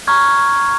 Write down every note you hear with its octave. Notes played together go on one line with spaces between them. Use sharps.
A#5 C#6 F6 G#6